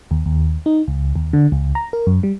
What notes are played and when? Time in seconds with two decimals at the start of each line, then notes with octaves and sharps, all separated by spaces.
0.11 D#2
0.26 D#2
0.66 D#4
0.88 C#2
1.16 D#2
1.33 D3
1.52 C#2
1.75 A#5
1.93 A#4
2.07 F#2
2.23 G3